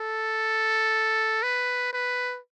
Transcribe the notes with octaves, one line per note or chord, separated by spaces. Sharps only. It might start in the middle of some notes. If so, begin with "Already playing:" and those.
Already playing: A4
B4
B4